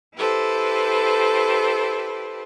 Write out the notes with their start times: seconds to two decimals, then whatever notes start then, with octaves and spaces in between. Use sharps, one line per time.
0.16 E4 G4 A4 B4 C5